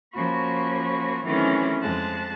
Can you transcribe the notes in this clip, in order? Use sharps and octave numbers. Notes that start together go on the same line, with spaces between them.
F3 A#3 C#4 F#4 B5 C#6
D#3 E3 F#3 A3 C4 C#4
F2 G#3 A5 F#6